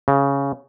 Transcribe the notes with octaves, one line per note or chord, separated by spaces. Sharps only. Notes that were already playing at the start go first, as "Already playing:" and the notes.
C#3